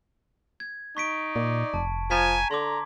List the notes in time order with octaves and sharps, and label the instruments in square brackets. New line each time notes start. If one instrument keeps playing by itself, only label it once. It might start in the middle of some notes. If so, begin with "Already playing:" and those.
[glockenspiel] G#6
[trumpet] D#4 [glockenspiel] C#6 B6 D7
[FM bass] A#2 [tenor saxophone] D5
[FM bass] F1 [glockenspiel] A5
[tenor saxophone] F3 [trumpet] G#5 [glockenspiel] A#5 G#6 B6
[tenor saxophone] D3 [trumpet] A#5 [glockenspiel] C6 D6